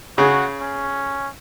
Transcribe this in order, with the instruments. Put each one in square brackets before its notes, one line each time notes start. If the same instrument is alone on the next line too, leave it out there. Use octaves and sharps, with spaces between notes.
[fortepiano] C#3 G#4 [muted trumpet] F#4
[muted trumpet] C#4